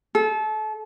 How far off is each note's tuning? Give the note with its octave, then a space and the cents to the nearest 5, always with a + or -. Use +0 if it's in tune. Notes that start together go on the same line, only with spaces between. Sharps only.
A4 -30